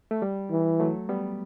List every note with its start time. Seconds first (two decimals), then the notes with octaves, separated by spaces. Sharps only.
0.11 A3
0.22 G3
0.51 E3
0.80 F#3 A3
1.09 G3 B3